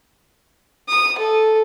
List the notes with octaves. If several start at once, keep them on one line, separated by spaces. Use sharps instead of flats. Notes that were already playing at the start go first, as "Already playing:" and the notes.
D#6
A4